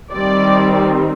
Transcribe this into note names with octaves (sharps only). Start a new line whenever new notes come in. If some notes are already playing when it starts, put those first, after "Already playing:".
D#3 G3 C4 D5